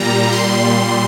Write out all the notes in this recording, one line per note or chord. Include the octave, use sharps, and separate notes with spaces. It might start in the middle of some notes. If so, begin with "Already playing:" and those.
Already playing: A#2 G3 A#5
A#2 G3 C6